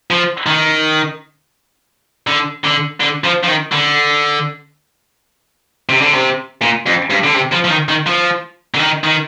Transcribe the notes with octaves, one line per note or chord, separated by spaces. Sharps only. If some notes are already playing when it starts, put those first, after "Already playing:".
F3
D#3
D3
D3
D3
F3
F3
D#3
D3
C3
D3
C3
A#2
F2
G2
D3
C3
F3
F3
D#3
D#3
F3
D3
D#3
D#3